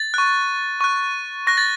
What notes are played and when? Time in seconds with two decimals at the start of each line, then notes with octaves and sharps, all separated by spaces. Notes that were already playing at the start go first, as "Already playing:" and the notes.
Already playing: A6
0.14 C#6 F#6
0.81 C#6 F#6
1.47 C#6 F#6 A#6
1.57 A6